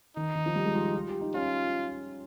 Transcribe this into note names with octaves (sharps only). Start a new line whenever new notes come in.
D#3 D#4
D#3
F3
G3
G#3
F4
G4
F4
G4
D#4
C#4 F4